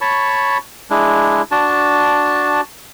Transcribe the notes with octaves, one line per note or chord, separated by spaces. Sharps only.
C#5 A5 B5 C#6
G#3 D4 E4
D4 F#4 A5